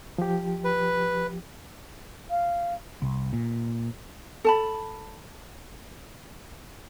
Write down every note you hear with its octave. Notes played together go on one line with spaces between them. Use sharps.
F3 G4
B4
F5
C2
A#2
A4 A5 B5